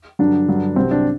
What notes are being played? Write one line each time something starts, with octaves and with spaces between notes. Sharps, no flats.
G2 D3 F#3 D4
G2 D3 F#3
C2 C3 F#3 C4
D4